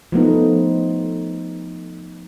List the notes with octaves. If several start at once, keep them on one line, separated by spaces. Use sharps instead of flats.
F3 A3 B3 D#4